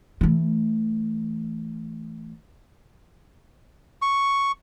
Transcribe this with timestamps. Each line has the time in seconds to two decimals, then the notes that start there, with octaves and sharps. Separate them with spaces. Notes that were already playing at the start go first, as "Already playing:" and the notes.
0.21 E3 A3
4.02 C#6